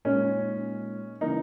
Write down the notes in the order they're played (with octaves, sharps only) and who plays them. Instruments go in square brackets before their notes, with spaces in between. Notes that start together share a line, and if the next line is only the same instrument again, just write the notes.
[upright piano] A#2 G#3 D#4 A#4 C#5 [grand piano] C#4
[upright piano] C#3 E3 A#3 [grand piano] D#4